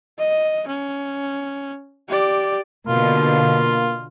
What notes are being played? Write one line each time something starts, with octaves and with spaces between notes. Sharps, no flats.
D#5
C#4
G4 D5
B2 D3 A#3 F4